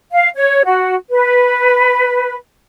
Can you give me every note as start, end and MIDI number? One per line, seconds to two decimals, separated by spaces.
0.12 0.29 77
0.35 0.62 73
0.64 0.94 66
1.10 2.35 71